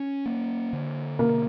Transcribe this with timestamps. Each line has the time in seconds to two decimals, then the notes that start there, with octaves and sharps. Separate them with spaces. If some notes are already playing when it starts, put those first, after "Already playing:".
Already playing: C#4
0.26 A#3
0.73 D3
1.19 B2 A#3